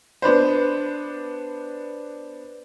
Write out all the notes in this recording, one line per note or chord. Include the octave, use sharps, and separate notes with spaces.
B3 D4 B4 C5